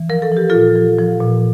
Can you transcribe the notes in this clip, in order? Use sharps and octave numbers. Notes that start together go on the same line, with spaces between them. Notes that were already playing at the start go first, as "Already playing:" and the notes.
Already playing: E3
F3 A#4
A4
F3 G4
A#2 F4 A4
F3
F3
A#2